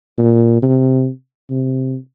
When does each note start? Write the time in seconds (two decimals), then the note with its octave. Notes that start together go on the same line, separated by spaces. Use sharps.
0.18 A#2
0.62 C3
1.50 C3